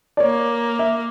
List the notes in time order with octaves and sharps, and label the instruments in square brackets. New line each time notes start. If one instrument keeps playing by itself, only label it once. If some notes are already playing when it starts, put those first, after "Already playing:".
[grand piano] D5
[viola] A#3 [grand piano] C#5
[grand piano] E5